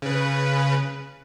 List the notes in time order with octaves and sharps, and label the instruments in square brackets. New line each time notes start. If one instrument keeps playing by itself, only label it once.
[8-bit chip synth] C#3 B4